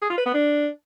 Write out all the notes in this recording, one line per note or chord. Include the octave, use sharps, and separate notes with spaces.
G#4
F4
B4
B3
D4